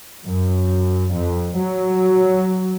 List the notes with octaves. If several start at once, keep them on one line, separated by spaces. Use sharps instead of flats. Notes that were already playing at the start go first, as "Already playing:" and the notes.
F#2
F2
F#3